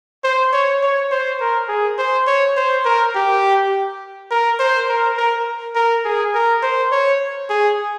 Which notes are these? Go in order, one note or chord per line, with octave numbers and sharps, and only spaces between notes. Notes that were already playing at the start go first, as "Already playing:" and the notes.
C5
C#5
C#5
C5
A#4
G#4
C5
C#5
C5
A#4
G4
A#4
C5
A#4
A#4
A#4
G#4
A#4
C5
C#5
G#4